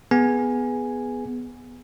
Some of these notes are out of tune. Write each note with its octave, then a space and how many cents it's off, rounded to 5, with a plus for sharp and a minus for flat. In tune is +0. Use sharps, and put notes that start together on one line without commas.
B3 +0 G#4 +0 G#5 +0